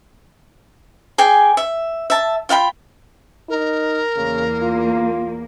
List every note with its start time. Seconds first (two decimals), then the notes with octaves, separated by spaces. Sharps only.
1.18 G#4 D5 G5 G#5
1.57 E5
2.10 E5 A5
2.49 F4 F5 G5 B5
3.49 D#4 A#4
4.16 E2 C#3 A#3
4.62 F4